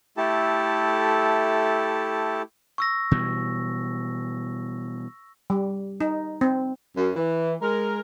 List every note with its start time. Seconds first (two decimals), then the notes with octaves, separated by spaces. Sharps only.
0.17 A3 E4 G4 A4 A5
2.78 C#6 E6 A#6
3.11 B2 E3 G3
5.50 G3
6.01 D#4
6.41 C4
6.96 F#2
7.15 E3
7.61 G#3 A#4